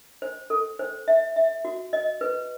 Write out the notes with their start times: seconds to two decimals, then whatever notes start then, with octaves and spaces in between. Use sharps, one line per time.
0.22 C5
0.50 A4
0.79 C5
1.08 E5
1.36 E5
1.65 F#4
1.93 D#5
2.21 B4